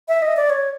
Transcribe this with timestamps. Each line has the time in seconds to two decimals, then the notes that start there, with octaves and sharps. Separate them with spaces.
0.08 E5
0.22 D#5
0.37 D5
0.50 C#5